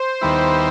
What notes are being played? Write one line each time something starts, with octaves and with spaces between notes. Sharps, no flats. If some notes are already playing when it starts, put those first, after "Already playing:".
Already playing: C5
D#2 D#3 G3 B3 E4